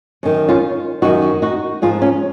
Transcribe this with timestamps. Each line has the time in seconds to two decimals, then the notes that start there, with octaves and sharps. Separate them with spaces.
0.23 F#2 D#3
0.49 C#4 F4
1.02 F#2 D#3 D#4 F#4
1.42 D#4 F#4
1.82 G#2 F3 F4 G#4
2.02 C#4 F4